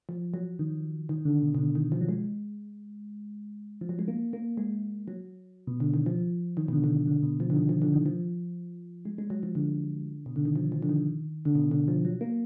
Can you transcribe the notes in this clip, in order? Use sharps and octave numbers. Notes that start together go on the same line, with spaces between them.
F3
F#3
D#3
D#3
D3
B2
B2
D3
D#3
F3
F#3
G#3
F3
F#3
G#3
A#3
A#3
G#3
F#3
B2
D3
D#3
F3
D#3
B2
D3
D3
D#3
D3
B2
F3
D3
D#3
F3
D3
D#3
F3
G#3
G#3
F#3
F3
D3
B2
D3
D#3
F3
F3
D3
D#3
D3
B2
D3
F3
F#3
A#3